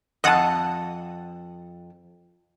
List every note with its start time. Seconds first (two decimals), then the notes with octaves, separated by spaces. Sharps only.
0.24 F2 D#5 F#5 A5 D#6